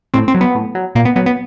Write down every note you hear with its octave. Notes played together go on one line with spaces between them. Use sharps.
A2 C4
C4
F#3
B3
A2
F#3
A#2 A#3
B3
F#3 B3
B3